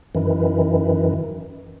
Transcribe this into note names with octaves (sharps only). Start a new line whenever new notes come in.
F#2 D#3 E3